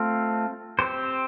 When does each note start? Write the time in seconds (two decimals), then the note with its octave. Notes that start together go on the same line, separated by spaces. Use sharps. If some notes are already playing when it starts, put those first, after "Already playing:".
Already playing: A3 C4 F4
0.79 C4 G4 C5